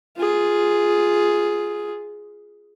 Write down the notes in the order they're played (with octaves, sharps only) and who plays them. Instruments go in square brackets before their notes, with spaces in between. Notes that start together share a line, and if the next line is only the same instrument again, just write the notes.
[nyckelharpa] F4 G#4